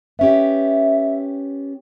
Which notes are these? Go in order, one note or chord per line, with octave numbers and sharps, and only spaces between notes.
B3 C#4 G4 E5